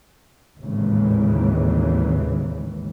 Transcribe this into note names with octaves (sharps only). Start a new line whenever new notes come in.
G#1 D#2 A2 C#3 E3